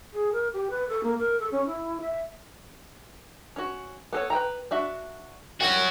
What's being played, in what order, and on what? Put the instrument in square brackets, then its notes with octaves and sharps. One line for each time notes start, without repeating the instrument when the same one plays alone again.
[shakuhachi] G#4
A#4
G4
B4
A4
A#3
A#4
A4
C#4
E4
E5
[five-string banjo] C#4 F#4
B3 A4 C#5
B4 G5 A#5
D4 F#4 E5
[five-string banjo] G3 E4 G5 [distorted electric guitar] C#4 F#4